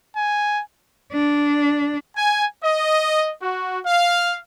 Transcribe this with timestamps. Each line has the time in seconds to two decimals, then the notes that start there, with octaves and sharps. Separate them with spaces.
0.16 G#5
1.13 D4
2.16 G#5
2.63 D#5
3.42 F#4
3.86 F5